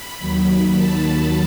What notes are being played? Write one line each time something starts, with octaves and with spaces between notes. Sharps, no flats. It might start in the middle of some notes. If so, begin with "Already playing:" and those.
Already playing: B5
D#2 D#3 F#3
A5